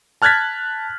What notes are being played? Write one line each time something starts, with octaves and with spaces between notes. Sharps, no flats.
A5 F6 F#6 G#6 A6 B6